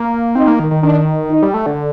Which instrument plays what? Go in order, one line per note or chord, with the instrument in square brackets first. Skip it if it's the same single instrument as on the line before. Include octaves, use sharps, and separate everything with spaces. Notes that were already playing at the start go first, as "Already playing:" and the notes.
Already playing: [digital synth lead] A#3
[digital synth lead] C4 [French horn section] D#4
[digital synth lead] A#3
D#3
D#3
[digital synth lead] D#3 [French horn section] D4
[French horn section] D#4
[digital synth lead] G3
A3
D3